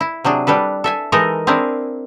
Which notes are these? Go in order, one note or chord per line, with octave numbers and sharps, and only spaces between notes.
E4
C3 F#3 D4 G#4
G3 D4 A4 B4
A4 E5 G#5
E3 G#3 D#4 A4 A#4 D#5
C4 D4 E4 G#4 A#4